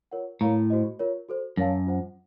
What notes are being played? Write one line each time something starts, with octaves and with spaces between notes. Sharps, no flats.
F4 A#4 C#5 F#5
A2 A#4 C#5 F5 A#5
F#4 C5 D#5
F4 A#4 C#5
F#4 A4 C5
F#2 A#4 C#5 F5 A5
F4 C5 F#5